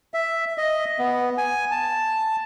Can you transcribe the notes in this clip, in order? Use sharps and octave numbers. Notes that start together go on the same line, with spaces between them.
E5
D#5
B3
G#5
A5